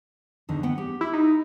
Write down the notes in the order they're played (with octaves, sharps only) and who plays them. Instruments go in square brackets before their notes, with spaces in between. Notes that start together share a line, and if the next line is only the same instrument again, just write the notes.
[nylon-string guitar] E2 D3 D#3
B3 F#5 G5
G4
[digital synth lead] E4
D#4